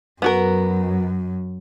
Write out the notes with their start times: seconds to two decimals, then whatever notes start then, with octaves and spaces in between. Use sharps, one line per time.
0.22 F#2 B3 F#4 A#4